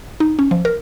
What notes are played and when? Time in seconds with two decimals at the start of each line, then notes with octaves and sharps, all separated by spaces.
0.20 D#4
0.39 C#4
0.51 F3
0.65 A#4